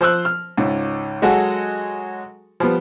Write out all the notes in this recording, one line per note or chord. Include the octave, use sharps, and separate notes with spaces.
F3 C5 E6 F#6
F6
C#2 G#2
F#3 G#3 F#4 G#4 A4 F#5
F3 G3 B3